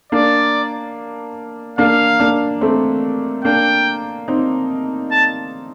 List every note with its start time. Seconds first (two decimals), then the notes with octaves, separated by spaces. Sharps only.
0.12 A#3 D4 D5
1.78 A#3 D4 F5
2.20 A#3 D4
2.61 A3 C4
3.44 A#3 D4 G5
4.28 C4 D#4
5.11 A5